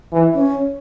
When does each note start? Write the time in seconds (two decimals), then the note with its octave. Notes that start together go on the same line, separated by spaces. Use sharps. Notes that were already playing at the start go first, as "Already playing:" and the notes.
0.12 E3
0.34 C#4